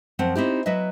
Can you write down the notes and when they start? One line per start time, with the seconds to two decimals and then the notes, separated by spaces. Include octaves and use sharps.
0.19 F#2 F3 C4 F#5
0.35 C4 D#4 E4 G4
0.66 F#3 B4 D#5 E5